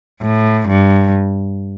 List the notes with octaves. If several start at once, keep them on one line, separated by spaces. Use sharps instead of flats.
A2
G2